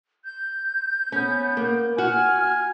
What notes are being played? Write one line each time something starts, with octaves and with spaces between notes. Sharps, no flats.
G6
B3 C#4
A#3
F#4 G#5 F6